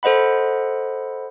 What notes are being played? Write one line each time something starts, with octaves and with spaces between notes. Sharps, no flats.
A4 C5 D#5 F#5 B5